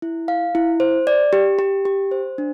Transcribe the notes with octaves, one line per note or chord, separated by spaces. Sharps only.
E4
F5
E4
C5
D5
G4
G4
G4
C5
D4